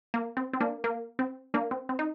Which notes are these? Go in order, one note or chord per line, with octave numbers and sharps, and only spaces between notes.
A#3
C4
C4
A#3 D4
A#3
C4
A#3 D4
C4
C4
D#4